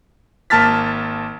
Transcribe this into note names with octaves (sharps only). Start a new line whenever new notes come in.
G#1 A#3 A5 F6 A6 B6